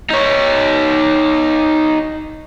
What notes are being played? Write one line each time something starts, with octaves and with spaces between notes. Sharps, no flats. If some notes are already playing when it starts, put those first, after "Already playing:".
D#4 C#5